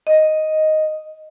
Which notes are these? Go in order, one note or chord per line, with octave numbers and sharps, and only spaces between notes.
D#5